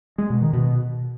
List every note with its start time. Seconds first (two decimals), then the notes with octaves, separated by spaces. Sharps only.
0.18 G#3
0.30 B2
0.42 D#3
0.53 B2